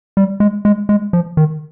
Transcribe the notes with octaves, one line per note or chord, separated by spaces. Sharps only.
G3
G#3
G#3
G#3
F3
D#3